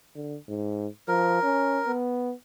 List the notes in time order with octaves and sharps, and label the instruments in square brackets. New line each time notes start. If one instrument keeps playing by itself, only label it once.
[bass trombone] D3
G#2
[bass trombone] F3 [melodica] A#4
[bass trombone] C#4
B3